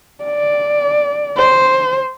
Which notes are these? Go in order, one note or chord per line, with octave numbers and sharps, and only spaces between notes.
D5
C5